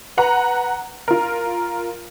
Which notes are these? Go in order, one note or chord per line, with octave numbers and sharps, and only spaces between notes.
B4 F#5 A#5
F4 A#4